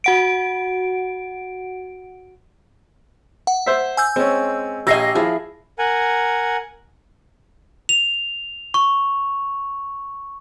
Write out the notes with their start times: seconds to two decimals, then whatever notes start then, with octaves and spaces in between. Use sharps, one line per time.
0.04 F#4 F#5 D7
3.47 F#5
3.66 C5 E5
3.97 G#5 E6 G6
4.16 G#3 C4 C#4
4.87 A#1 G4 C#5 D#5 G#5 E6 A#6 C7
5.15 F3 E4 G#4
5.79 A#4 F#5 G#5
7.89 F7
8.74 C#6